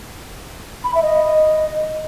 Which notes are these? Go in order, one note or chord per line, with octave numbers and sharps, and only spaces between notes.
B5
E5
D#5